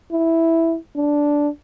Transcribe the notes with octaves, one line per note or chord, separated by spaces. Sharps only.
E4
D4